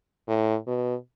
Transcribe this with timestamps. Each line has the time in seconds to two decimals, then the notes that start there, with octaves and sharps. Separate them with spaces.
0.28 A2
0.67 B2